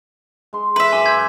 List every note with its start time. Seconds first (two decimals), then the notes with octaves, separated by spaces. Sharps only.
0.53 G#3 C6
0.76 E3 B4 E5
0.92 F#2 G#5 C6 D6
1.06 G6 G#6 B6